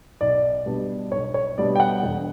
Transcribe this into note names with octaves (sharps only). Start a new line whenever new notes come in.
B1 D5
B2 G3 B3 D4
B1 C#5
C#5
B2 G3 B3 D4 D5
G5
F#5
E1